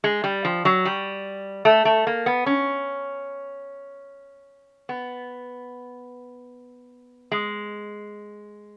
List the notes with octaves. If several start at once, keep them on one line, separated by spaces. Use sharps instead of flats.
G#3
G3
F3
F#3
G3
A3
A3
A#3
B3
C#4
B3
G#3